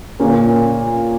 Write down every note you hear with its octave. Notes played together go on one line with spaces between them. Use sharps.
A#2 A#3 C#4